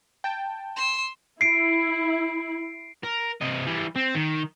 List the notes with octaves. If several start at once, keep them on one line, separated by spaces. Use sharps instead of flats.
G5 A5
C6 E6
E4 C7 D7
A#4
C3 D#5
E3 G3
C4
D#3